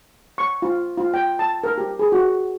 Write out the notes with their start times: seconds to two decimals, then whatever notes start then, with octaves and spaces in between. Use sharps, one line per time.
0.38 C#6
0.62 F4
0.98 F4
1.14 G5
1.39 A5
1.64 A#4
1.78 G4
1.99 G#4
2.12 F#4